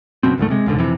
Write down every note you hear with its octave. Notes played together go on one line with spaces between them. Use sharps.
F#1 F#2 B2 C4
F#1 D2 G#2 A3
C3 G#3
E1 C#2 G#2 D3
F2 C3 E3